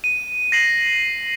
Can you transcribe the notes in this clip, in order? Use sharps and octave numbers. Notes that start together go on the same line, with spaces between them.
D#7
A#6 C7 F#7